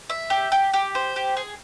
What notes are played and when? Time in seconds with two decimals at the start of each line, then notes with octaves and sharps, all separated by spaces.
0.10 E5
0.30 G4
0.52 G4
0.74 G4
0.95 C5
1.16 G4
1.37 G#4